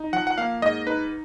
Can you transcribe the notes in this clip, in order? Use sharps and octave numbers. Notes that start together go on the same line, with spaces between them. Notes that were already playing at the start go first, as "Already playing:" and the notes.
Already playing: D#4
F3 F#5
F#5
A#3 F5
G#2 D#5
D#4 B4